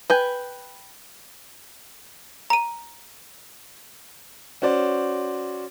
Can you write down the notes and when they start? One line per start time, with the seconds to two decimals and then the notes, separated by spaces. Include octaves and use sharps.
0.10 B4 G5 G#5
2.50 A#5 D#7
4.62 C#4 F#4 C5 D5